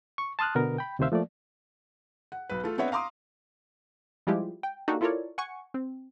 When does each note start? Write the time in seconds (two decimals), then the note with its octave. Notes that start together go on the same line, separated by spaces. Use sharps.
0.18 C#6
0.39 A5 C6 D#6 F6 F#6
0.55 B2 D3 B3 A#4
0.78 G5 B5
0.99 D2 C3 D#3 C5 E5 F5
1.12 F3 A3 A#3 D5
2.32 F#5
2.50 B1 B4
2.63 A3 F4 A4
2.78 B3 C4 D4 C#5 E5 F#5
2.92 F5 A#5 C6 D6 D#6
4.27 F3 G3 G#3 E4 F4 G4
4.63 G5
4.88 A#3 D4 D#4 F#4 G4 A4
5.01 E4 F4 A4 A#4 C#5 D5
5.38 F#5 G#5 C#6 C#7
5.74 C4